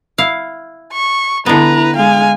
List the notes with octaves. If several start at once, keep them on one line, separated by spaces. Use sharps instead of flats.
E4 F5
C#6
D3 B3 E4 B4 A#5
G#3 F5 G#5